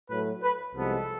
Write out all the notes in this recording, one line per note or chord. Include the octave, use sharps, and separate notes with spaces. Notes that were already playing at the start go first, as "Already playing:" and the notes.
A2 F#3 A3 B4
B4
C2 C3 F3 G#3 B3 A4